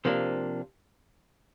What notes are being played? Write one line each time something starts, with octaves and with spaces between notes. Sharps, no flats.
C3 F3 A#3 D4